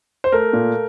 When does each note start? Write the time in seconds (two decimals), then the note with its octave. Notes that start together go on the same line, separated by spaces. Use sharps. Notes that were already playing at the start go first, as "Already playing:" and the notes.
0.24 C5
0.32 A3 A#4
0.53 A#2